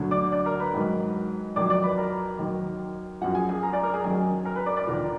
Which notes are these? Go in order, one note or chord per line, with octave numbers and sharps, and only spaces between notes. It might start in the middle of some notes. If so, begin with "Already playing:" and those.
Already playing: D2 D3 F#3
D5 D6
D5 D6
A#4 A#5
B4 B5
G#2 D#3 F#3
F2 D#3 F#3 D5 D6
D5 D6
B4 B5
A#4 A#5
D#2 D#3 F#3
F#2 F3 F#4 F#5
G#4 G#5
G#4 G#5
A#4 A#5
D5 D6
A#4 A#5
G#4 G#5
F#2 D#3 F#3 G#4 G#5
A#4 A#5
B4 B5
D5 D6
D5 D6
D#2 D3 F3 A#4 A#5